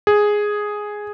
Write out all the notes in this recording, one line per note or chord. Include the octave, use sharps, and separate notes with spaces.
G#4